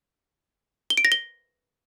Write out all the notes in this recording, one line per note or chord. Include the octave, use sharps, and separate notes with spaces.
G7
D7
A#6
G7